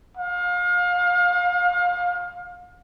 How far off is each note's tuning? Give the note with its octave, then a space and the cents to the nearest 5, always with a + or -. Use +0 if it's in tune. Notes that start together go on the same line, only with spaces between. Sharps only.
F5 +35